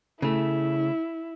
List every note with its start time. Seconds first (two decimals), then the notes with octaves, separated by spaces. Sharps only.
0.22 C#3 A3 E4